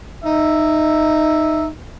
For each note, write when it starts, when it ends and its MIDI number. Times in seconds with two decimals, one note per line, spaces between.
0.24 1.66 63
0.24 1.66 76